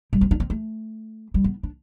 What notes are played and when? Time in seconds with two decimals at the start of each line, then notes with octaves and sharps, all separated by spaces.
0.13 G3
0.21 C4
0.31 D4
0.40 C4
0.50 A3
1.34 G3
1.44 B3
1.63 D4